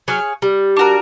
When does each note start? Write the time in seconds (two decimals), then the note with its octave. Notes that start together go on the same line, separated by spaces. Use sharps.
0.08 F#3 G#4 C#5 F5 G#5
0.42 G3
0.77 D4 F#4 A#4